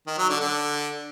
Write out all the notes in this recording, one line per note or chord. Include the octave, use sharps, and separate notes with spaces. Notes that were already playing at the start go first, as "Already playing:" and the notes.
D#3
F#3
D3
D3